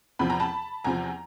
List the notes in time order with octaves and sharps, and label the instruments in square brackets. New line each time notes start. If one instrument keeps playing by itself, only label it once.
[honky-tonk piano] E2 C3 F3 B5
A#5
A5 B5
E2 C3 F3 G#5 A#5